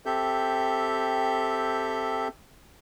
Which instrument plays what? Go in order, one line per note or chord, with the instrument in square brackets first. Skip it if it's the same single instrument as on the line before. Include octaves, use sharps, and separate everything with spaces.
[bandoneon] C4 G4 A4 E5 G6